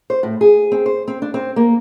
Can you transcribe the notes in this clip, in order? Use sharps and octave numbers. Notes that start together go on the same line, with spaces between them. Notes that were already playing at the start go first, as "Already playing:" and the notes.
C5
A2
G#4
C4
C5
C4
D4
C4
A#3